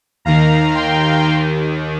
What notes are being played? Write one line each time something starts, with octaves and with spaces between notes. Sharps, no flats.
D#2 D#3 F5 A#5
G5 C6
D#2 D#3